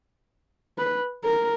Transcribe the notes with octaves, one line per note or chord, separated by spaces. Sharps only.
B4
A#4